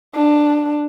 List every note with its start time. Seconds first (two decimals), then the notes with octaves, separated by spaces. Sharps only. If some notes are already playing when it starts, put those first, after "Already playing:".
0.15 D4